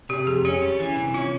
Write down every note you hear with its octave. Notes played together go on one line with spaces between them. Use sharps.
C3 G4
F2 G#4
C#4 G4
G3
E3
C3
C#4 F4